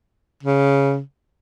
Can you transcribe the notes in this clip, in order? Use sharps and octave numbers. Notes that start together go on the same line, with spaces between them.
C#3